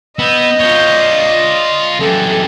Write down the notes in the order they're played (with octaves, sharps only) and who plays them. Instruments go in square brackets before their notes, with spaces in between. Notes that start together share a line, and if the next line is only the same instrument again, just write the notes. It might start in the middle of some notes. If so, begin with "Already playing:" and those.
[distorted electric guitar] B3 [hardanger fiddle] D#5 [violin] E6 G6
[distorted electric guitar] F4 C#5 [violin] G6
[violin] D5
[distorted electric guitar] F#2 E3 [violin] G4 A4